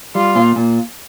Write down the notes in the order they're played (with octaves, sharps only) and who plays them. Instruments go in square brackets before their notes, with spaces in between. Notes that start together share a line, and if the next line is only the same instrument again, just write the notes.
[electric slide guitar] G3 [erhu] F4
[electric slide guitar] A#2
A#2